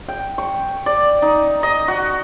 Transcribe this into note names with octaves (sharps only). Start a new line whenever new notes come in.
G5
C#6
D5
D#4
D#5
F#4